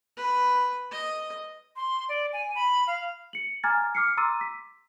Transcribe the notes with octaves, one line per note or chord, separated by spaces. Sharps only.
B4
D#5
C6
D5
G#5
B5
F5
C#7 F#7
G#5 A#5 D6 F6 G#6 A6
D6 F6 C7 C#7
A#5 C6 D6 E6 A6 D#7
B6